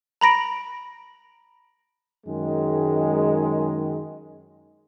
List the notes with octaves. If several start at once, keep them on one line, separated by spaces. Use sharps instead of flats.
A#5 B5 A#6 D7
F#2 D#3 G#3